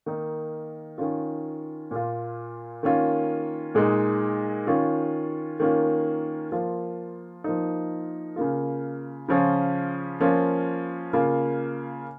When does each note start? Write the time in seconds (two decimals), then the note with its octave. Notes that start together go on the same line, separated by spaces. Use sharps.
0.06 D#3 A#3 D#4
0.98 D#3 C#4 F4
1.91 A#2 A#3 F4
2.83 D#3 A#3 C#4 F4
3.75 A#2 G#3 D#4
4.67 D#3 C#4 F4
5.60 D#3 A#3 C#4 F4
6.52 F3 A#3 F4
7.44 F3 A#3 D#4
8.36 C#3 A#3 F4
9.28 C#3 F3 C#4 F4
10.20 F3 A#3 C#4 F4
11.13 C#3 A#3 F4